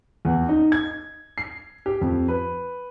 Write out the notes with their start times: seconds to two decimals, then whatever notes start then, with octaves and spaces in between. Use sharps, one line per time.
0.25 E2
0.49 D#4
0.72 G#6
1.38 C7
1.86 G4
2.01 F2
2.28 B4